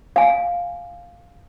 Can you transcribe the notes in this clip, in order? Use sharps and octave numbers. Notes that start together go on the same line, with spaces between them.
F5 G#5